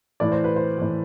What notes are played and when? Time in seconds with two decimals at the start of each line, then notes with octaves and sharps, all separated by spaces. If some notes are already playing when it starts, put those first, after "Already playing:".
0.20 A2 E3 D5
0.32 C5
0.44 B4
0.56 C5
0.78 A2 E3